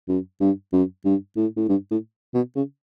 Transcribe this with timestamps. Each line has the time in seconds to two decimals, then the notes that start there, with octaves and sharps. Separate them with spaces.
0.09 F#2
0.41 G2
0.73 F#2
1.05 G2
1.37 A2
1.57 A2
1.69 G2
1.91 A2
2.35 B2
2.56 C#3